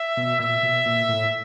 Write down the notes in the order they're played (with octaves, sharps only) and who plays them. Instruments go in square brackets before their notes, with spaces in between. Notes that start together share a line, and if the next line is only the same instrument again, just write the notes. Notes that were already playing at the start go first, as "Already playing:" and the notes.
Already playing: [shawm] E5
[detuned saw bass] B2
[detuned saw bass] A#2 [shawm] E5
[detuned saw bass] B2
A#2
A2